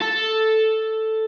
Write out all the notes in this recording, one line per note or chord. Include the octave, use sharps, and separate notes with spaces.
A4